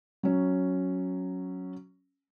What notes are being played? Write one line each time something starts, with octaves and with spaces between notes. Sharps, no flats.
F#3 C#4